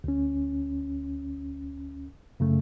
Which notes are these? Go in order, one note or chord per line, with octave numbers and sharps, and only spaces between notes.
D2 C#4
F#2 C#3 A3